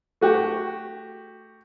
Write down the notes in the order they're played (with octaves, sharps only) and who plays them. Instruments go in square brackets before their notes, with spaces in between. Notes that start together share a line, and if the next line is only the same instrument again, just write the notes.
[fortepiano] A3 F#4 G4